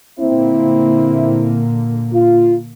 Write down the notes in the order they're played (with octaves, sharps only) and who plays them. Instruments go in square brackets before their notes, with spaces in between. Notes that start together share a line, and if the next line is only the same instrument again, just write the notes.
[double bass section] A#2 D3 A#3 [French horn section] C4 E4
[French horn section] F4